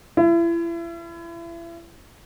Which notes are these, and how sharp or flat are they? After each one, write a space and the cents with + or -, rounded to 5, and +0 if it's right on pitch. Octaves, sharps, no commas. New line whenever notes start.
E4 +35